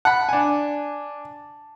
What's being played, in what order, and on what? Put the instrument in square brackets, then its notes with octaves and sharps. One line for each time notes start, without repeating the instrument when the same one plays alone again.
[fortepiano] F#5 B5 [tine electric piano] A5
[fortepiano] D4 G#5